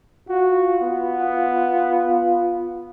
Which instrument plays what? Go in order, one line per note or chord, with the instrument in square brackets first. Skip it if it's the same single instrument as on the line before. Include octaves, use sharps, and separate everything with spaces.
[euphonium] F4 [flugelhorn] F#4
[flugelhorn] B3